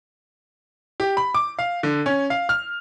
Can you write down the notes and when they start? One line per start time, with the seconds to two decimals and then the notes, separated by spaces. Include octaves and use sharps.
1.00 G4
1.17 B5
1.34 D6
1.59 F5
1.83 D3
2.06 C#4
2.30 F5
2.49 F6